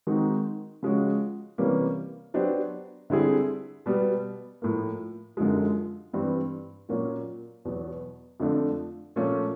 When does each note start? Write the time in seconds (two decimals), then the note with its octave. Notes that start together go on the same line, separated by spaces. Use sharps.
0.07 D#3 G#3 C4 D#4 F#4
0.83 C#3 F3 G#3 C#4 F#4
1.58 C3 E3 G3 A#3 C#4
2.34 F#3 B3 D4 G4 C5
3.10 D3 G3 C4 E4 G#4
3.86 B2 G3 B3
4.62 A2 F3 A#3
5.37 F#2 D3 F3 G#3
6.13 G2 E3 G3 C4
6.89 A#2 F#3 A#3 C#4 F#4
7.65 E2 B2 F#3
8.40 F2 D3 F3 A3 D4
9.16 A#2 F3 A3 C#4